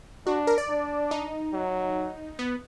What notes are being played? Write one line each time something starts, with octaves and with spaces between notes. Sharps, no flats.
D4 F#4
A#4
D5
D4
D#4
F#3
B3